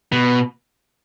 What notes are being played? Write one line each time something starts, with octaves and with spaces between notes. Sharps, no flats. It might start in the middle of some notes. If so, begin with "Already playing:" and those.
B2